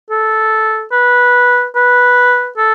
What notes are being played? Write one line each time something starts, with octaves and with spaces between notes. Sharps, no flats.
A4
B4
B4
A4